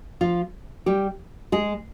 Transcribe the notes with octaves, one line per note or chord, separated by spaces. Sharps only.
F3 F4
G3 G4
G#3 G#4